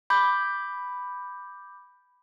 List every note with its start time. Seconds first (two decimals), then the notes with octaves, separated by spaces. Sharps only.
0.10 B5 D6 G6